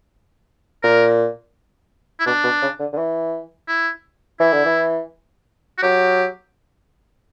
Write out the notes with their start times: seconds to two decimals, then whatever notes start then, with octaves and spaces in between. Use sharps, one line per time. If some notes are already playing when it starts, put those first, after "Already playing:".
0.83 A#2 A#4
2.20 E4
2.26 B2 D4
2.44 B2
2.62 C#3
2.79 D3
2.93 D3
2.98 E3
3.68 E4
4.40 E3 E4
4.53 D3
4.65 E3
5.78 F#4
5.83 F#3 G4